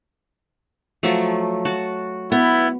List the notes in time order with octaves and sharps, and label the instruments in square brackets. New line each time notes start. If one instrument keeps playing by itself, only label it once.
[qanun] F3 F#3 A3
F#4 A5
[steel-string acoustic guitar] B3 [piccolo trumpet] E4